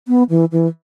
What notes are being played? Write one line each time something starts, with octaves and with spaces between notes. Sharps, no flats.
B3
E3
E3